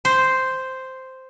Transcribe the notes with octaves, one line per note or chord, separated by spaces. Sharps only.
C5